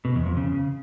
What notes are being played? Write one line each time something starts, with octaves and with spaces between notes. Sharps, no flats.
B2
E2
F2
C#3